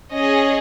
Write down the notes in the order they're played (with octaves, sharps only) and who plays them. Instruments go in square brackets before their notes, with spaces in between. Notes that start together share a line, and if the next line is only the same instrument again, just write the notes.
[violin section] C#4 G#4 D#5